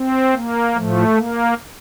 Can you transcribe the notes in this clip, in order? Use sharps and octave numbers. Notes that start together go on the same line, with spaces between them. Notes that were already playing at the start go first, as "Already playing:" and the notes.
Already playing: C4
A#3
A2 F3 A3
A#3